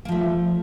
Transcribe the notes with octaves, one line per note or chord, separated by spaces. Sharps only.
F3 A3 A#3